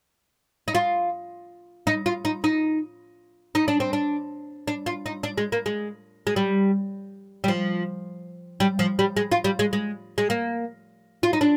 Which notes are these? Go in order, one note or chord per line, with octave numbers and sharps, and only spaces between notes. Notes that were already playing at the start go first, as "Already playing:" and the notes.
D#4
F4
D#4
F4
D#4
D#4
D#4
D4
C4
D4
D4
F4
D#4
D4
G#3
A#3
G#3
G#3
G3
G3
F3
G3
F3
G3
G#3
F4
G3
G#3
G#3
G#3
A#3
F4
D#4
D4